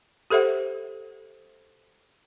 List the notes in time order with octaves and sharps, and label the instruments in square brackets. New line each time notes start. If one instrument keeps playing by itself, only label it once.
[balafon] G4 A4 C5 E5 F#5